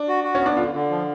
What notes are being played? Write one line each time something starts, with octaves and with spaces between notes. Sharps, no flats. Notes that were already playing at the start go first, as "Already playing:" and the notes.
Already playing: D4
F#4
F#4
C#4
B3
D4
D3 F4
D3
F3